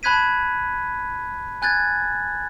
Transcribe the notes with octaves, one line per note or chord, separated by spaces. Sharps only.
A5 B5 F#6 G#6 B6 D#7
G#5 F#6 G#6 A6